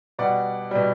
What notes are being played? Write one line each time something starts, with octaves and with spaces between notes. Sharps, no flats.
B2 G3 D5 F#5
B2 G3